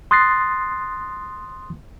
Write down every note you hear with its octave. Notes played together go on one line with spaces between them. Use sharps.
C6 D#6 F#6 A6 A#6 C7